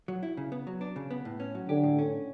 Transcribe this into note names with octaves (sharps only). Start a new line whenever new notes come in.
F#3
E4
C#3
B3
F#3
D4
C#3
B3
A2
C#4
F#3
D3 G4
A2
C#4